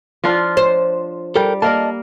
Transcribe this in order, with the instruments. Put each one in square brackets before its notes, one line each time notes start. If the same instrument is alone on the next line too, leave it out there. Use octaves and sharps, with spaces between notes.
[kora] F3 D4 F4
[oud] C5
[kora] G3 [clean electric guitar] A4 A#4 G5
[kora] A#3 A#4 [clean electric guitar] D5 D#5 A5